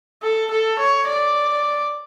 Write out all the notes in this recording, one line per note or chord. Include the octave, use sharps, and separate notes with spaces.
A4
A4
C#5
D5